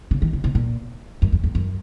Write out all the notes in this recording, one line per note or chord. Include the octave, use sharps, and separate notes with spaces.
C#3
D#3
C#3
C3
A#2
F#2
F2
F2
F#2